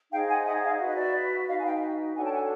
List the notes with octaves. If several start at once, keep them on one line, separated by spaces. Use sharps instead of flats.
D#4 G#4 C5 F5 G5
F#5 G#5
E5 F#5
D#5 F5
F#4 B4 E5
D#5
D5 E5
D#4 F#4 B4 D#5 F5
G#5
F5 G5
D4 F#4 A4 C#5 F#5 G#5
G5 A5
F#5 G#5